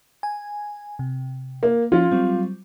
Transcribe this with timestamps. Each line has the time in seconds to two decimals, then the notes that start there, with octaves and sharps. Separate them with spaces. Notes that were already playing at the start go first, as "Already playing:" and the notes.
0.23 G#5
0.99 C3
1.63 A#3
1.92 F3 C#4 F4
2.12 F#3 G3 C4